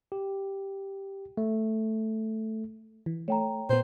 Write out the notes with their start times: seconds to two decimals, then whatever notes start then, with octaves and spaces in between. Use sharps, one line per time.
0.12 G4
1.37 A3
3.06 E3
3.28 A3 C#5 G5 A#5
3.70 A#2 B3 C5